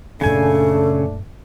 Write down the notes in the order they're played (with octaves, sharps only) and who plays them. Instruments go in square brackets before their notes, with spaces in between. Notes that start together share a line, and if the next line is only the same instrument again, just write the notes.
[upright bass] F#2 A#2 [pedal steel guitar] C#3 G#5 [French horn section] A3 D4 [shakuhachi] A4